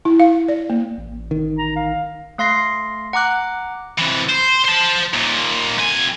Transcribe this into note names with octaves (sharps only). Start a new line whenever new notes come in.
E4
F5
D5
A#3
A1
D#3
A#5
F5
A3 F5 C6 A#6 C7
F#5 A#5 D6 F#6
C3 E3
C5
C5 A5
D#2 A#2
F2 G#5